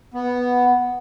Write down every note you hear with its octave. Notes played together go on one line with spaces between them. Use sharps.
B3